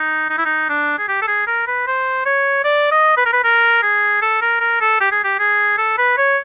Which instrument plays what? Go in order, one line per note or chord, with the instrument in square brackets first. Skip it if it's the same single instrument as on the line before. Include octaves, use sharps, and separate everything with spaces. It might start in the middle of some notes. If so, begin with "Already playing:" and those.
Already playing: [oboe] D#4
D#4
E4
D#4
D4
G#4
G4
A4
G#4
A#4
B4
C5
C#5
D5
D#5
B4
A#4
B4
A#4
G#4
A4
A#4
A#4
A4
G4
G#4
G4
G#4
A4
B4
C#5